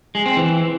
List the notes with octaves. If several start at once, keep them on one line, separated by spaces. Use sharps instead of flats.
G#3
C4
E3